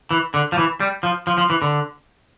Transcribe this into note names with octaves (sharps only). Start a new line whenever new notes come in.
E3
D3
F3
E3
G3
F3
F3
F3
E3
D3